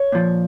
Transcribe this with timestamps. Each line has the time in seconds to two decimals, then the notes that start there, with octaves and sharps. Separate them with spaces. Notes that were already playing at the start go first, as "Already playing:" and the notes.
Already playing: C#5
0.12 A#2 F3